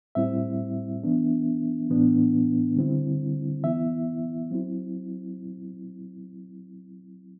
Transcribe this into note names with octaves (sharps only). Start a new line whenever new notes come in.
A2 G3 C4 E4 E5
E3 B3 D4
A2 E3 B3 D4
D3 G3 C4 E4
E3 B3 E4 E5
F#3 C4 E4